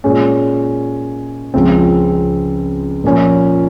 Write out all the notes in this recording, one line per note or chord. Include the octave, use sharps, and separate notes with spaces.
A#2 G#3 C#4
C#2 C#3 F3 C4
A#2 F3 A#3 C#4